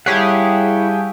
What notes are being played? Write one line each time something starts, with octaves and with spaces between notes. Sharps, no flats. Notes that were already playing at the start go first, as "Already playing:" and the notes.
G3 E4 G4 G#4 C#5 F5 F#5 A5